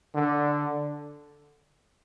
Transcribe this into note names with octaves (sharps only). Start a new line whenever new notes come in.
D3